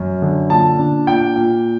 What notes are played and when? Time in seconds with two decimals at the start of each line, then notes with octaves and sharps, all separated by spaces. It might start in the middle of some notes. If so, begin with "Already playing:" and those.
Already playing: F#2
0.22 D3
0.50 A#2 A5
0.79 D4
1.07 A#2 G5
1.36 A#2